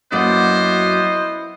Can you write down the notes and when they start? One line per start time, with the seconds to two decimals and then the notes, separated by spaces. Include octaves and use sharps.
0.12 F#2 F#3 A#3 B3 E4 C5 D5 D#5